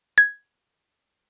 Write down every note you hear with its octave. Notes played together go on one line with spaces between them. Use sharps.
G#6